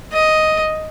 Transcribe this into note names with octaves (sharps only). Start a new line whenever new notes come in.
D#5